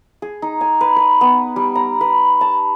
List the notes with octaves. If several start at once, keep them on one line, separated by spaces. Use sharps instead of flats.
G#4
D#4
G#5
B4
B4
B3
G3
A#5
B4
A5